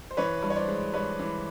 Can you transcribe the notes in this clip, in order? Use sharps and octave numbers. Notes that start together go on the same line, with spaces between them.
C5
E3 B4 C#5
G2
C#5
C5 D5
G#3
G2 B4 C#5
E3